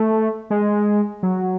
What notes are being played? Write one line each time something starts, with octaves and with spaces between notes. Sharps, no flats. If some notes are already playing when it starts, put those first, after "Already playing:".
Already playing: A3
G#3
F#3